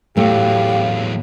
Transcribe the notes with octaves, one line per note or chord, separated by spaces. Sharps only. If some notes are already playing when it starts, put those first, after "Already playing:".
E2 A2 F#3 A3 G4 F5